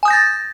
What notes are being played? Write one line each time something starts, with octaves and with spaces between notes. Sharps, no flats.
G#5 D#6 G6 A6 A#6